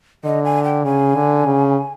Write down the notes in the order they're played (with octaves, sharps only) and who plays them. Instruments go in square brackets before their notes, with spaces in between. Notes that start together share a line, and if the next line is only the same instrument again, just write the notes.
[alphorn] D3 [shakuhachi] D#5
[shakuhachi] G#5
G5
[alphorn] C#3 [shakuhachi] G#5
[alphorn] D3
C#3